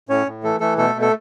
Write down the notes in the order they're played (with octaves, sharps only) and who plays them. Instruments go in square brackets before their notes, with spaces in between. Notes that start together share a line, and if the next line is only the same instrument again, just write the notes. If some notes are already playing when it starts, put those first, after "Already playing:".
[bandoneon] A2 C#4 C#5
A2
E3 A3 A4
E3 A3 A4
B2 A3 A4
B2
A4